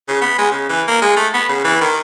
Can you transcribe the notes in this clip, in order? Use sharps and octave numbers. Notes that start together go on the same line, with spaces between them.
C#3
B3
G#3
C#3
E3
A#3
G#3
A3
B3
C#3
E3
D#3